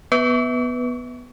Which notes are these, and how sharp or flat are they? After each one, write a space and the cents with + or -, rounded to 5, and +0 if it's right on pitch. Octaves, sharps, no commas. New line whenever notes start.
B3 +0 B4 +0 C#6 +15